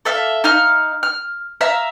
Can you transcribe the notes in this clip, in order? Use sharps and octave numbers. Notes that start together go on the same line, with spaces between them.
A4 E5 F5
D#4 F5 F6
F6
E5 F5 A#5 E6